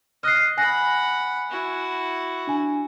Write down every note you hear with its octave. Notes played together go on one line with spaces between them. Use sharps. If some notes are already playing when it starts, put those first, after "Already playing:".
D#5 F6 F#6 C7
F#5 G#5 B5 F#6 A#6
E4 F#4
D4 G#5